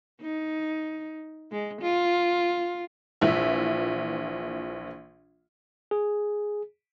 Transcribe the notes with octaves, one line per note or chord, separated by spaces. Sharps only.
D#4
G#3
F4
A#1 E3 F4 E5
G#4